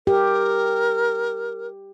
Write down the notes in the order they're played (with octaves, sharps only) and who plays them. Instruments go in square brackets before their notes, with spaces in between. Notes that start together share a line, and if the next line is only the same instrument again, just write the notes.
[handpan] G4 [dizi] A#4